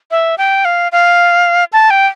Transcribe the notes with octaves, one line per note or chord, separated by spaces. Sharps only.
E5
G5
F5
F5
A5
G5